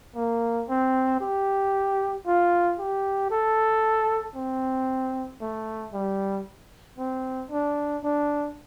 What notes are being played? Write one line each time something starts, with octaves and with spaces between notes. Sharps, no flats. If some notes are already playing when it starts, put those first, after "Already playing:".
A#3
C4
G4
F4
G4
A4
C4
A3
G3
C4
D4
D4